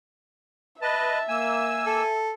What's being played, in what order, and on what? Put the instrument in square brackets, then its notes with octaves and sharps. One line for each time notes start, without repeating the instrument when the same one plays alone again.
[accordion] B4 D#5 [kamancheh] E5 [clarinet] A5
[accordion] A#3 E6 [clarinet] G#5
[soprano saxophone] A4